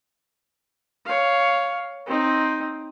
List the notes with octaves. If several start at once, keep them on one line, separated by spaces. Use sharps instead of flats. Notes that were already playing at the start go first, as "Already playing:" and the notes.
C#5 F5
C4 D#4